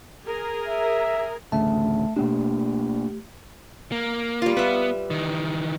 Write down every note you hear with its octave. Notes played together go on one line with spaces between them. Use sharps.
G#4 A#4
E5
A1 D2 C#3 A3 E5 A5
B2 A3 A#3 D4 G4
A#3
G3 F4
B3 B4 E5
D#3 E3